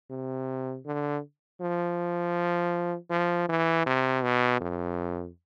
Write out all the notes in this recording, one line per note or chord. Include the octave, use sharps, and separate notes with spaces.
C3
D3
F3
F3
E3
C3
B2
F2